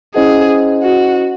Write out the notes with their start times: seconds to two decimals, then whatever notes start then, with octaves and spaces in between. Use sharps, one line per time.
0.15 C#4 E4 G#4 C5 D#5 F#5
0.83 F#4